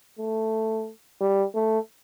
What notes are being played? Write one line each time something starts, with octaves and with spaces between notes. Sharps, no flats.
A3
G3
A3